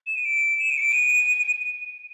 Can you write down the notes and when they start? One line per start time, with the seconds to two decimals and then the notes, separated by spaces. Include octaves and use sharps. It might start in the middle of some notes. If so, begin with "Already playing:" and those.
0.07 E7
0.15 D#7
0.25 D7
0.59 E7
0.70 D#7
0.77 C#7
0.81 D7
0.92 D#7